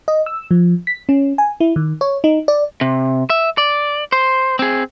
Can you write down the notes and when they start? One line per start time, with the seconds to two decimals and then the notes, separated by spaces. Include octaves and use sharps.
0.08 D#5
0.26 E6
0.51 F3
0.87 B6
1.09 C#4
1.38 G#5
1.60 E4
1.76 D#3
2.01 C#5
2.24 D#4
2.48 D5
2.81 C3
3.30 E5
3.58 D5
4.12 C5
4.59 C4 G#4